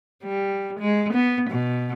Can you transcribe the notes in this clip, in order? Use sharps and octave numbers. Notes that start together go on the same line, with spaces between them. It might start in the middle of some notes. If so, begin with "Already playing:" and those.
G3
G#3
B3
B2